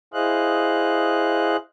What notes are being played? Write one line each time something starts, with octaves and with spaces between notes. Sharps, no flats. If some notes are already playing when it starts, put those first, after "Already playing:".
E4 G#4 C5 D#5 F5 F#6